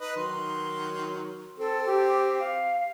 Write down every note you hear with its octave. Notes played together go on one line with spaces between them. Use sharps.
D#4 B4 D#5
D#3 F#3 C6
C4 A4
G4
F5